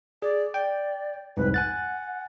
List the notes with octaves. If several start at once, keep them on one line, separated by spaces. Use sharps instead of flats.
G#4 D5
D5 G5
C2 F2 G#2 B4
F#5 G#5 F#6 A6